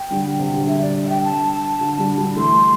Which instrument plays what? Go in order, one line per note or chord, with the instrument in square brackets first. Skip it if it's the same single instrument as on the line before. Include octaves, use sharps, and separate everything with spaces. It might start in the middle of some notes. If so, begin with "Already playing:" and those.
Already playing: [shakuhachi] G5
[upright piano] D3 G3
C3
D3
[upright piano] D3 [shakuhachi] E5
[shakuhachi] D5
E5
G5
A5
[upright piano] D3
D3 G3
D3 G3
[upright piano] E3 A3 [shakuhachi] C6